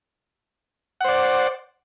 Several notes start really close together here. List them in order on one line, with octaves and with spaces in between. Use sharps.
F#5 C5 D5